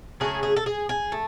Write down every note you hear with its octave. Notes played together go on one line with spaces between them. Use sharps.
C#3 F#3 A3 G#4
G#4
A4
G#4
G#4
A3